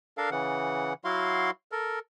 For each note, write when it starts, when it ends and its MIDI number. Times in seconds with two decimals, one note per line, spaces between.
0.18 0.30 62
0.18 0.30 69
0.18 0.30 70
0.18 0.30 77
0.31 0.93 49
0.31 0.93 52
0.31 0.93 78
1.05 1.51 54
1.05 1.51 64
1.05 1.51 66
1.05 1.51 77
1.05 1.51 84
1.72 1.99 69
1.72 1.99 70